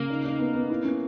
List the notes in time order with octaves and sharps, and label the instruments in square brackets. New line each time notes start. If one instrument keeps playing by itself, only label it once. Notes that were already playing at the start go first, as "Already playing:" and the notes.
Already playing: [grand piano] C#3 [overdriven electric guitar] A#3
[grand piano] D#4
D#4
B3
B3
E4
C#4